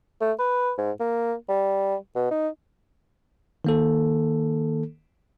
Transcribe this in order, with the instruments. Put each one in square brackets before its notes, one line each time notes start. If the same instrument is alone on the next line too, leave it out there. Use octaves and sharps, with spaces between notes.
[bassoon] A3
B4
G#2
A#3
G3
B2
D#4
[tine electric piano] D#3 A#3 A4